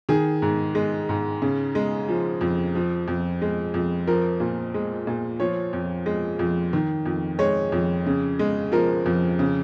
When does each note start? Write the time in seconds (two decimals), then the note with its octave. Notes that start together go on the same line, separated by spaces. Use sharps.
0.09 D#3 G#4
0.42 G#2
0.75 G#3
1.09 G#2
1.42 C#3
1.75 G#3
2.08 F3
2.41 F2
2.75 F3
3.08 F2
3.42 G#3
3.74 F2
4.07 F3 A#4
4.40 A#2
4.74 G#3
5.07 A#2
5.40 F3 C#5
5.73 F2
6.06 G#3
6.39 F2
6.73 D#3
7.06 F2
7.39 G#3 C#5
7.72 F2
8.06 C#3
8.39 G#3
8.72 F3 A#4
9.06 F2
9.39 C#3